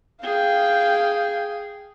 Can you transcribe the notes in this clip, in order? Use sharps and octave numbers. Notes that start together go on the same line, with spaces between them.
G#4 F5 G5